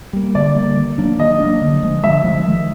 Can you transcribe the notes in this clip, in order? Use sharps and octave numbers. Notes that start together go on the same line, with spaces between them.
G3 A#3
D3 D5
G3 A#3
D#3
F#3 A#3 D4
D#3 D#5
F#3 A#3 D4
D3
F3 G#3
D3 E5
F3 G#3
D#3